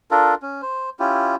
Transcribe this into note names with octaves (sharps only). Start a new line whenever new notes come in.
D4 F4 A4 A#4
C#4
C5
C#4 E4 F4 G4